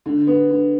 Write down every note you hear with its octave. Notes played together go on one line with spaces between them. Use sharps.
D3
B3
D3